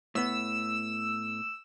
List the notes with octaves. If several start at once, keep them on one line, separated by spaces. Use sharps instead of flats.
A2 B3 E6